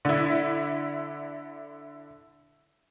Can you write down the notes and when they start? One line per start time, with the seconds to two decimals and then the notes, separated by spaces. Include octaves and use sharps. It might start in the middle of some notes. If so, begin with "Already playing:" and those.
0.05 D3 E4